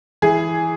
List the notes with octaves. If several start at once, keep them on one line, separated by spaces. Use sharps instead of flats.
E3 G#4